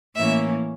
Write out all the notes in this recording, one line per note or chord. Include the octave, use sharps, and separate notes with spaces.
A2 E3 A#3 C#4 E5